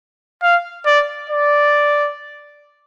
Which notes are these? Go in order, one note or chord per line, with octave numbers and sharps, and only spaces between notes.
F5
D5
D5